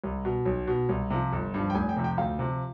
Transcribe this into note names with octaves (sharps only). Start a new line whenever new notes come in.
C2
B2
B1
B2
C2
C3 F3
G1
G2 F3
G5
F1 G#5
G5
F2 C3
G5
D2 F5
C3 F3